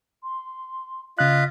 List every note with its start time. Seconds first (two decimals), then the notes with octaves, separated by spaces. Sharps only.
0.23 C6
1.19 C#3 F4 D#5 F5 F#6 B6